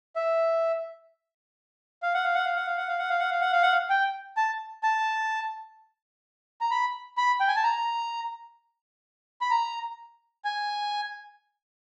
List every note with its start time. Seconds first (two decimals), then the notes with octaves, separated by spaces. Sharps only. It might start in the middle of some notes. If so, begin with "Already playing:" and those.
0.16 E5
2.03 F5
2.14 F#5
2.24 F5
2.35 F#5
2.46 F5
2.56 F#5
2.67 F5
2.77 F#5
2.88 F5
2.99 F#5
3.10 F5
3.19 F#5
3.31 F5
3.41 F#5
3.52 F5
3.63 F#5
3.72 F5
3.90 G5
4.37 A5
4.83 A5
6.61 A#5
6.71 B5
7.17 B5
7.40 G5
7.48 G#5
7.56 A5
7.64 A#5
9.41 B5
9.51 A#5
10.45 G#5